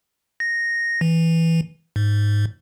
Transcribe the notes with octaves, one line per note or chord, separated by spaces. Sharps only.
A#6
E3
G#2